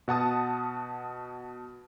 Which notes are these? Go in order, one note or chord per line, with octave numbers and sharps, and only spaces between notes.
B2 F#5 A5 D#6